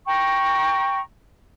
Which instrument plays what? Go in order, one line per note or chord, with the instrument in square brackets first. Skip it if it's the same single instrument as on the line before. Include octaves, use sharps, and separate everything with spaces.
[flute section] G5 A#5 C#6